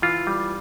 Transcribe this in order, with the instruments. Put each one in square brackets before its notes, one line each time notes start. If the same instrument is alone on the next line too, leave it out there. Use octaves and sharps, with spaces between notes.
[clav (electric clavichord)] E3 F4
G3